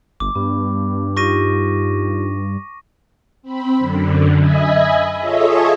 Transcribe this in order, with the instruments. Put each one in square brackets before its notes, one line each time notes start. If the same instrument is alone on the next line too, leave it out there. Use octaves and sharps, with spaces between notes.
[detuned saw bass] G1 [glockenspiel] D6
[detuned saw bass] G2 [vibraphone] B3
[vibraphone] D#4 F4 G4 [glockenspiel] C#6 A#6 D#7
[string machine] C4 B5
F#2 D3
D#5 E5 G#5 B5
F4 G#4 A4 C#5 D#5 E5